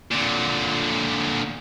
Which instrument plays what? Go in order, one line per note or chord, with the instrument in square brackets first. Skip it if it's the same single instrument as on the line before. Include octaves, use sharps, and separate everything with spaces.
[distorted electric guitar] A#2 D3